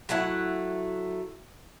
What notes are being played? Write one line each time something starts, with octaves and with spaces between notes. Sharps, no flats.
F#3 A3 E4 F#5